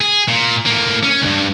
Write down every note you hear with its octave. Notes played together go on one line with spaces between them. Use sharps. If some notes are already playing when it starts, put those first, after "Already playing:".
G#4
A#2
A2 A#3
C#4
C#2 G2